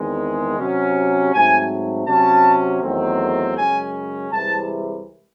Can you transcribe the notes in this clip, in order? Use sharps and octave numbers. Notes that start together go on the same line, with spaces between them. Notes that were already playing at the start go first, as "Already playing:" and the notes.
Already playing: E2 D#3 G#3 C4
C3 F#3 C#4
G#2 F#3 A3 C4 G#5
C3 F#3 C#4 A5
E2 D#3 F#3 A3 C4
F#2 C#3 G#3 C#4 G#5
C2 C3 E3 G#3 A5